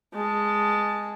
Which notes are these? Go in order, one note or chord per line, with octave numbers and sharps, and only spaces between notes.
G#3 A5